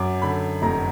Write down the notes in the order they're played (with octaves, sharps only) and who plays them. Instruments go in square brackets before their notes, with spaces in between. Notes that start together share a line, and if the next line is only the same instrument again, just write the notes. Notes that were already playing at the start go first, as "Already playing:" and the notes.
Already playing: [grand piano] F#2 D6
D3 B5
F1 A#5